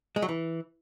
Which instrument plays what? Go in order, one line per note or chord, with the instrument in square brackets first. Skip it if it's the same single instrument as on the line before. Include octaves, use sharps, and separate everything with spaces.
[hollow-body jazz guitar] G#3
F#3
E3